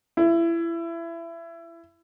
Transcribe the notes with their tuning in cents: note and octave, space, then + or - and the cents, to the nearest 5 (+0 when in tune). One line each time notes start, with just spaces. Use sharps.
E4 +25